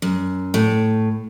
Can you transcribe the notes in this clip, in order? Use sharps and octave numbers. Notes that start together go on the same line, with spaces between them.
F#2
A2